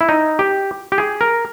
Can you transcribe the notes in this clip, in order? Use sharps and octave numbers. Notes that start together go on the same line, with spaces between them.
E4
D#4
G4
G4
G#4
A#4